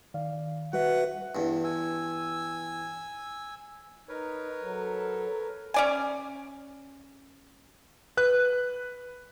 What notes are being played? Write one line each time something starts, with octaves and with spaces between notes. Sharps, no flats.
D#3 D5 F5
G3 F#4 B4 E5 F#5
E2 G2
G#5 E6
D#4 A#4 B4 C#5
F#3 A4
C#4 D5 G#5
B4 F#6